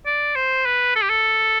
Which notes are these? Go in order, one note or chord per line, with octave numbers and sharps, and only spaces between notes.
D5
C5
B4
A4
G4
A4